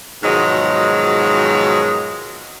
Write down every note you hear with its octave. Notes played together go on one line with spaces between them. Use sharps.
G#2 B2 D#3 F3 F#3 G#3